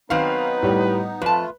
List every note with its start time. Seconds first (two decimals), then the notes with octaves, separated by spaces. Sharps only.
0.10 D#3 F#3 B3 C4 D#4 B4 F5
0.63 A2 G3
1.22 F2 A3 F4 B4 A5